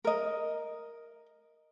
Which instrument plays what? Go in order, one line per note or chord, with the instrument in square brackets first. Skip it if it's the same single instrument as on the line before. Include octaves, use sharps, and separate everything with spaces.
[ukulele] A#4 D#5